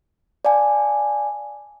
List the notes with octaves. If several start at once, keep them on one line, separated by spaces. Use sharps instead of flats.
D5 F5 G#5 A5